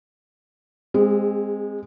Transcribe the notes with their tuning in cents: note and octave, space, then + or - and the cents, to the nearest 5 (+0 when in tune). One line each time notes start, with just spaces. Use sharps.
G#3 -10 C4 +0 G#4 -45